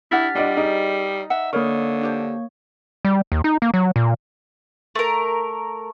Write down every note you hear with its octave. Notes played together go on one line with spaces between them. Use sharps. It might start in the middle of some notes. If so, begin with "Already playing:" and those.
D4 E4 G4 F#5 F6 A6 B6
G3 D4 E4 F4 D5 D#5 F#5
D#4 G#4
E5 F#5
D3 A#3 A#4 C#5 C#6
D4 G4 C5
G3
D#2
D#4
A#3
F#3
A#2
A3 A#4